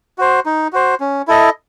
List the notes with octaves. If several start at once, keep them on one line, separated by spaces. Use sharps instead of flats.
F#4 C5
D#4
F#4 C5
C#4
E4 A4 D#5